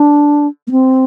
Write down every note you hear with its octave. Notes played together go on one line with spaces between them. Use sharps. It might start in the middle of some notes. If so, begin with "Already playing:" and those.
Already playing: D4
A#3
C4